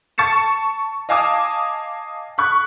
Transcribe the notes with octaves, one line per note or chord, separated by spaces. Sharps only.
A5 C#6 A6 C#7 E7
D#5 F5 G#5 A5 D6 D#6
B5 C#6 F#6